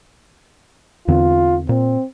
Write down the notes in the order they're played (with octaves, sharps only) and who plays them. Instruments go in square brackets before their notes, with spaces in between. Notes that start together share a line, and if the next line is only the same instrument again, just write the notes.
[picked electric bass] E2 D3 C4 [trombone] F4
[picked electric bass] A#2 [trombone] C4